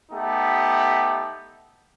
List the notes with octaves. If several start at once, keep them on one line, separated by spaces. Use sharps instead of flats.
A3 B3 D#4 G4